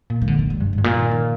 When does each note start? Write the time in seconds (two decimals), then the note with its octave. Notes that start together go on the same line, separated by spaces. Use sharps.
0.10 A#2
0.22 D#3
0.28 D3
0.39 D#3
0.50 G3
0.61 G2 C3
0.73 G#2
0.78 G2
0.84 A#2
0.95 D#3
1.11 D#3